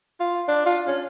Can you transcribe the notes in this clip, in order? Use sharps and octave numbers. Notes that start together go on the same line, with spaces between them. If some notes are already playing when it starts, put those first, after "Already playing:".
F4
D4
F4
C#4